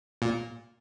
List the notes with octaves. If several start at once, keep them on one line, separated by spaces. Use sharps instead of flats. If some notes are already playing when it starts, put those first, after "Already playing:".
A#2